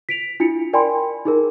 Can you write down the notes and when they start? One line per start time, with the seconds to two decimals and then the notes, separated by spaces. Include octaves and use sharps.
0.09 B6 D7 F7
0.40 D4 E4 F4 C#7
0.73 A#4 D5 G5 G#5 B5 C6
1.25 D#4 G#4 A#4